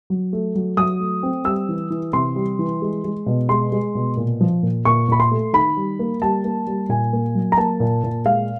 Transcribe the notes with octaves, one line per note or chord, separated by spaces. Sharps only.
F#3
A3
F#3
F#3 D#6
A3
C4
G3 E6
E3
E3
C3 C6
G3
E3
G#3
G#3
B2
G#3 C6
G#3
B2
A#2
F3
A#2
A#2 C#6
A#2 B5
C6
A3
D#3 B5
G3
A#3
G3 A5
A#3
G3
A#2 G#5
A#3
F#3
A#5
A#3 A5
A#2
A#2
G#3 F5